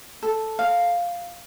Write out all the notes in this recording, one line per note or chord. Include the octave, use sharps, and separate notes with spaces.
A4
F5